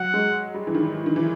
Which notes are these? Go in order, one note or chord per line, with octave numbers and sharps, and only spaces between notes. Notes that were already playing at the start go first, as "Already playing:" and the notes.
Already playing: F#3 F#5
G#3
G3
E3
D#3
D#3
E3